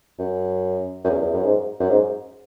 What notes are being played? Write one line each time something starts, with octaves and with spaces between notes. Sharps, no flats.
F#2
F#2
E2
E2
F#2
G#2
F#2
G#2